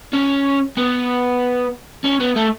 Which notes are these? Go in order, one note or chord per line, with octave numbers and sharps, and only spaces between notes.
C#4
B3
C#4
B3
A3